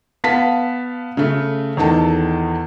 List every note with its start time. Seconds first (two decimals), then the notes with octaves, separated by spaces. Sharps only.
0.24 B3 F5 A5 B6
1.17 C#3 A3
1.77 E2 D#3 A4 A5